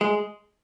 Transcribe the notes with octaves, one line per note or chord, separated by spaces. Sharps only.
G#3